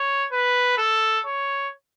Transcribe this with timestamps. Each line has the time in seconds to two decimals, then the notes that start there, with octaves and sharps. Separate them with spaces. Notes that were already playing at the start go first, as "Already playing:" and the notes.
Already playing: C#5
0.32 B4
0.78 A4
1.26 C#5